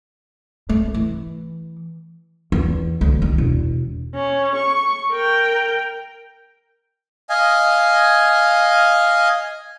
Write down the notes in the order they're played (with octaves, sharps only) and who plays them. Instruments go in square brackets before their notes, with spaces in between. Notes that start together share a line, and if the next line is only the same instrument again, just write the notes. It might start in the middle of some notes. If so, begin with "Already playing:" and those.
[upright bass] A3
E3
E2
D2
D#3
E1
[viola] C#4
C#6
A#4 G5
[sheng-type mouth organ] D#5 F5 G#5